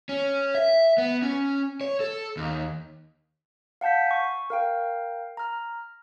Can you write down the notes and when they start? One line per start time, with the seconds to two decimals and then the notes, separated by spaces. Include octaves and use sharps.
0.09 C#4
0.55 E5
0.98 B3
1.22 C#4
1.81 C#5
2.00 A4
2.37 D#2
3.81 F5 F#5 A5 G6 B6
4.07 G#5 C#6
4.50 A#4 F5 G5
5.37 A#5 F6